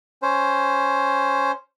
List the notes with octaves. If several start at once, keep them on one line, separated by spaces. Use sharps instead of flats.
C#4 C5